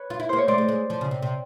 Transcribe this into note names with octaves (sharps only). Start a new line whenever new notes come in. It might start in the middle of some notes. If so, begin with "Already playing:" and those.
Already playing: B4 C#5
F4
E4
A#3 C5
C#5
A3 C5 D5
G#3
G#3
F3
C#3
C3
C3